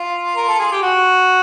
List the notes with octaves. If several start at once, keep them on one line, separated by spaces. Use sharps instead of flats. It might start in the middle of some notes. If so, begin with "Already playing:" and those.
Already playing: F4
A#4
A4
G#4
G4
F#4